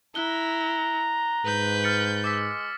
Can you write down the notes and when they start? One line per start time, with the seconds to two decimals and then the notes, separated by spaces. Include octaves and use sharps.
0.15 E4 A#5 F#6 G7
1.45 G#2 B4 G6
1.84 F6 A6 C#7
2.24 G#3 D6 E6 B6